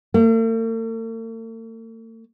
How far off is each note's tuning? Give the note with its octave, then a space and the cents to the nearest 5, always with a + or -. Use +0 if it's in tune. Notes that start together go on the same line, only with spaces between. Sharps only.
A3 +45